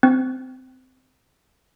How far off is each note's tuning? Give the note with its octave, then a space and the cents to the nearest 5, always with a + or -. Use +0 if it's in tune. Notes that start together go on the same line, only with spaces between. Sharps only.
C4 -20